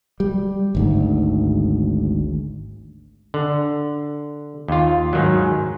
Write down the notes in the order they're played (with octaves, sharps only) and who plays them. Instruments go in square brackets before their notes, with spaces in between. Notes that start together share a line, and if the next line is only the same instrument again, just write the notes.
[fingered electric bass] G3
G#1 D2 G#2
[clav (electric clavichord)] D3
D#2 F4
G#2 D#3 F#3